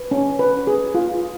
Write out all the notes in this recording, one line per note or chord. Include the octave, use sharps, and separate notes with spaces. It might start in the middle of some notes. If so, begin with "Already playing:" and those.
Already playing: B4
C#4
B4
G#4
F4